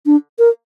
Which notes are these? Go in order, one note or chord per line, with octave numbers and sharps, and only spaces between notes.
D4
A#4